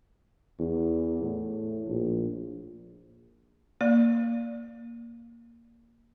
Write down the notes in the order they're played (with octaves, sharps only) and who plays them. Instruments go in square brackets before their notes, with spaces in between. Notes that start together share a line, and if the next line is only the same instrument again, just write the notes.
[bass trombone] E2
A2
A#1
[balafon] A#3 D5